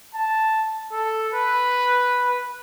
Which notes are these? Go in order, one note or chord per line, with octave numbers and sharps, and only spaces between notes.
A5
A4
B4